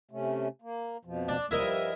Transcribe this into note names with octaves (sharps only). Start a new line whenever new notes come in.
C3 A3 C#4
A#3
F2 B2 F3
D4
G2 F3 G3 E4 A#4 D#5